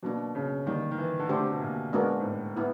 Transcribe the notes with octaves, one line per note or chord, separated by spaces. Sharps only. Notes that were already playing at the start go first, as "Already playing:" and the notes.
B2 F#3 A#3 D4
C#3
D3 D#3 G3 A#3
D#3
E3
D3
D3 A3 D4 G4 C5
C3
B2
A#2
G#3 B3 D4 F#4 A#4
G#2
A2
B3 E4